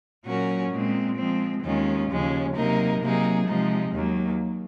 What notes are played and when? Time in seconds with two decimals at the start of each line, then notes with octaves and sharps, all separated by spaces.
0.25 A#2 F#3 C#4 F#4 A#4
0.71 A#2 G#3 C4
1.17 F3 G#3 C4
1.63 D#2 D#3 G#3 C#4 F4
2.09 D#2 C#3 F3 G#3 C#4
2.55 C3 F#3 A#3 D#4 A#4
3.01 C3 F#3 A#3 D#4 G#4
3.47 C3 F3 G#3 D#4
3.92 D#2 D#3 F#3 A#3